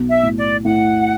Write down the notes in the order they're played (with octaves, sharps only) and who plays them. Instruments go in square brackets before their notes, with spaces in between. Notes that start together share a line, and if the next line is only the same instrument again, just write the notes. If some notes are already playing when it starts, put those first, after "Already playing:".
Already playing: [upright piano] B1
[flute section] E5
[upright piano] A2
[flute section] D5
[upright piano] A2 [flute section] F#5